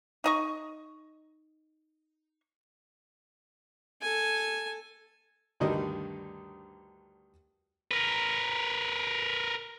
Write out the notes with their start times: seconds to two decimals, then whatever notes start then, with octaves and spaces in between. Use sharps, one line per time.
0.24 D#4 D#5 C#6
4.02 A4 G#5
5.60 D2 G2 D3 D#3 G3 D#5
7.91 A#4 B4